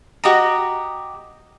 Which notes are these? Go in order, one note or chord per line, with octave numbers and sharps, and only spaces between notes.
F#4 G4 D#5 A#5